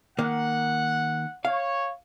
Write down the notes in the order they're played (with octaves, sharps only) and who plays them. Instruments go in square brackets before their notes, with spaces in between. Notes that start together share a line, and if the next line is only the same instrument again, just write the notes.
[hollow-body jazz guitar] D#3 A#3 [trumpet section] F#5
[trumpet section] C#5 [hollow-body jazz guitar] F5